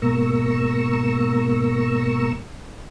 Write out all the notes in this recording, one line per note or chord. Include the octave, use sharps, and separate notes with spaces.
G#2 B2 A#3 A#5 C#6 E6